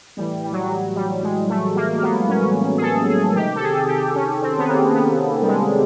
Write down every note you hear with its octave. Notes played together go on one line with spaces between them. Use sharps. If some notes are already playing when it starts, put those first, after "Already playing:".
A2 E3 G3
G3
F#3
G3
G3
G3
G#3
A3
A#3
A#3
B3
C#4
G#4
A4
G#4
C3 D#3 G4
A4
G#4
G4
C#4
C4
B3
A#3
B3
G3
G#3